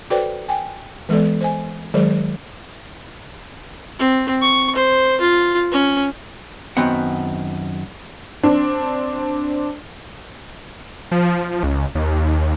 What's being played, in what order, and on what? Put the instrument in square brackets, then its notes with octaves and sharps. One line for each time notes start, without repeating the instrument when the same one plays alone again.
[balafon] F#4 A4 B4 C5 D5 G5
G5 G#5
E3 G#3 B3 A4 D5
C5 D#5 G#5
D#3 F#3 G#3 G#4 C5 D5
[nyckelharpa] C4
C#6
C5
F4
C#4
[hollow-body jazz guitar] F#2 D#3 B3 C4 F#5
[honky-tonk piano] C4 D4
[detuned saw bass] F3
C#2
D#2